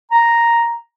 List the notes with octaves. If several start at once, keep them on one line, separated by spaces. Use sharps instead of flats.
A#5